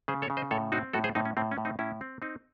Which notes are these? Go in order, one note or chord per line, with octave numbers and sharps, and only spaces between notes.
C#3 G#4 C5
A4 C#5
C#3
C5 D#5
A2 A4 C#5
C4 D#4 F#4
A2 F#4 A4
G#4 C5
A2 C4 D#4
C#4
A2 C4
C#4
A2
C4 D#4
A2 C#4 E4
C4
C4 D#4